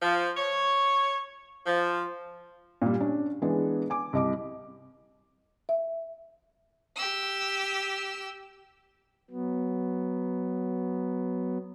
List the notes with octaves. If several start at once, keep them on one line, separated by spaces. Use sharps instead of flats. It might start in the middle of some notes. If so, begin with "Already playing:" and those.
F3
C#5
F3
A#2 G3
C#4 D4
E3 G#3 B3 D4
G#5 D6
C2 D#5 D6
E5
G4 E6
F#3 B3